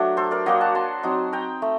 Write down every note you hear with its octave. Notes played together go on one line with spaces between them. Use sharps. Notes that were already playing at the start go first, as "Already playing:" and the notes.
Already playing: F#3 A3 D4 G4
A4 C5
A#4 D5
F#3 A#3 D4 D#5 G5
F#5 A5
A5 C6
F#3 C4 D#4
G5 A#5
A3